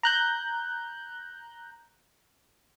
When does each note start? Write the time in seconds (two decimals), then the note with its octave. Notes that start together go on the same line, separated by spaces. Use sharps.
0.03 A#5 F#6 G6